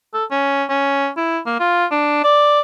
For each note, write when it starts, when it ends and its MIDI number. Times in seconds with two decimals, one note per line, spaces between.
0.14 0.25 69
0.31 0.64 61
0.70 1.09 61
1.17 1.39 64
1.46 1.59 58
1.60 1.85 65
1.91 2.23 62
2.24 2.61 74